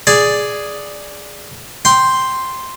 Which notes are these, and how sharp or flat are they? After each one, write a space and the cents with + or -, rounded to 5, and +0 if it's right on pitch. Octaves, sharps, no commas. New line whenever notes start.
G#4 +0 D5 +0
G5 +0 C6 +0